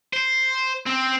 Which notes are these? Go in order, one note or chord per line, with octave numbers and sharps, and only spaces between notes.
C5
C4